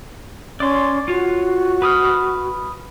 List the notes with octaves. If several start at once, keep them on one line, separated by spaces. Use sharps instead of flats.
C#4 D5 C6
F4 F#4 C#5
B4 D#6 F6